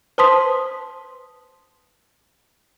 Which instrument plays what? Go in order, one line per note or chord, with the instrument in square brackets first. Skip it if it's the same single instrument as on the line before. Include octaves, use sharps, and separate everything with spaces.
[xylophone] B4 C5 A5 C6 D#6 B6